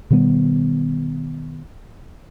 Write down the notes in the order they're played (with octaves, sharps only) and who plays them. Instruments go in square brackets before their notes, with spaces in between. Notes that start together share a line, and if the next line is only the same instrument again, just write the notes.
[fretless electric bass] B2 D#3 G3 B3